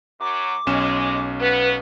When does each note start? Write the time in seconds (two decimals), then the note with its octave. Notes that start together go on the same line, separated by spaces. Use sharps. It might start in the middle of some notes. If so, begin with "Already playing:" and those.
0.20 F#2 F#3 D6
0.67 B1 G#3 C#4 E7
1.40 B3 B4